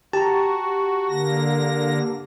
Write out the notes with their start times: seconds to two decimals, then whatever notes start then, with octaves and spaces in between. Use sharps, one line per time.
0.13 F#4 G4 A5 A#5
1.09 D3 A#3 A#6